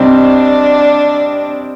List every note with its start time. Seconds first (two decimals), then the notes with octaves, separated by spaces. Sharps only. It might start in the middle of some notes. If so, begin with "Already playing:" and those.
Already playing: C3 G3 C4 D4 D#4